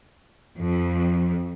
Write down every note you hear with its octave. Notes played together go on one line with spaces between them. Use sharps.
F2